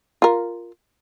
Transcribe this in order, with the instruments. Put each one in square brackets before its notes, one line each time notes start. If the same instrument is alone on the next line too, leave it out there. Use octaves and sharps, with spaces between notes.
[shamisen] F4 A#4